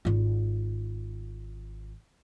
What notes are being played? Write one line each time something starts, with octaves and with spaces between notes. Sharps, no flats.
G#1 F4